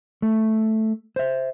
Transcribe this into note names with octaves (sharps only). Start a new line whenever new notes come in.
A3
C5 E5